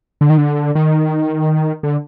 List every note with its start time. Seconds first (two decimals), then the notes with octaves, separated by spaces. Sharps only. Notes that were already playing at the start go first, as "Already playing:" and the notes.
0.21 D3
0.30 D#3
0.38 D3
0.75 D#3
1.83 D3